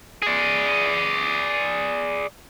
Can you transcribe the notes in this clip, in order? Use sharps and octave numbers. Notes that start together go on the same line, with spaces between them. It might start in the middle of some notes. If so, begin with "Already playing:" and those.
G#4 D5